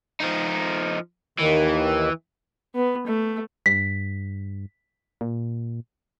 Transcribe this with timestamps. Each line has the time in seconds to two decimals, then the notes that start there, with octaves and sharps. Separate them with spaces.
0.20 F3 D#4
1.39 D#2 D#3 E3
2.75 B3
3.07 A3
3.66 G2 B6
5.21 A#2